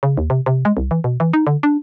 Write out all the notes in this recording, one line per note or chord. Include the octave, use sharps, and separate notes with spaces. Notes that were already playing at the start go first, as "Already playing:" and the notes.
C#3
D#2
C3
C3
G#3
C2
E3
B2
E3
D#4
D3
D4